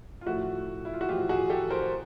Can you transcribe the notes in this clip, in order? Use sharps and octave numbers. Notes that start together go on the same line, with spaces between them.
F4
A2 F3 A3 E4 F#4
E4
F4
F#4
A2 F3 A3 F4 G4
F#4 G#4
G4 A4
A#4 C5
C5